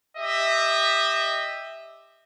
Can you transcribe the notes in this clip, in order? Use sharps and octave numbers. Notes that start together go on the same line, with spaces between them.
G4 D#5 E5